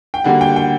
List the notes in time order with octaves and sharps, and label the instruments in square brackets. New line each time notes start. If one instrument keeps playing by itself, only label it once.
[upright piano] G5
[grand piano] D3 G3 A#3 F#4 [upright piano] F#5
[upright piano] G5
G5